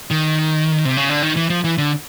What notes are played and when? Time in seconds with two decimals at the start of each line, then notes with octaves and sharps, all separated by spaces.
0.11 D#3
0.85 C3
0.97 C#3
1.10 D3
1.22 D#3
1.36 E3
1.50 F3
1.64 E3
1.78 D3